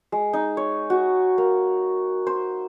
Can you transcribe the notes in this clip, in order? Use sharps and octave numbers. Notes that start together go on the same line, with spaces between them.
G#3
D#4
C#5
F#4
A#3
C5